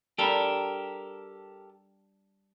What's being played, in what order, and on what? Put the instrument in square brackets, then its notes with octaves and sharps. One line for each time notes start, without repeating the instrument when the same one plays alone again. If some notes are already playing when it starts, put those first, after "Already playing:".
[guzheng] G3 D4 F4 [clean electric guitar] G4 A4 A#4